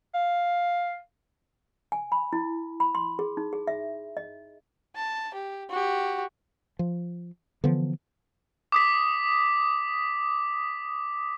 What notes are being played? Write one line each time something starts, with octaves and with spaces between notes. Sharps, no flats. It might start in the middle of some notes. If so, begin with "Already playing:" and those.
F5
G#5
B5
E4
B5
C6
G#4
D#4
G#4
E5
D#5
A5
G4
F#4 G4
F3
D3 E3 F3 B3
D6 D#6 B6